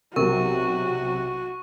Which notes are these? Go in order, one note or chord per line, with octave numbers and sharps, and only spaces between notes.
B1 C3 F#4 A#4 C#6